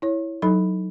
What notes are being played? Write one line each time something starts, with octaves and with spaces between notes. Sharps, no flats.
E4 C#5
F#3 D#4 A4 B5